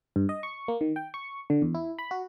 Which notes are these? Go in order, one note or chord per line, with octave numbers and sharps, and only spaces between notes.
G2
D#5
C#6
A#3
D#3
G5
C#6
D3
E2
E4
B5
F#4